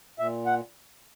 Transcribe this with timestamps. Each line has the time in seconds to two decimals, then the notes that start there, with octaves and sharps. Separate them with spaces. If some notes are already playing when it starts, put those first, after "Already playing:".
0.19 A#2 E5
0.46 F#5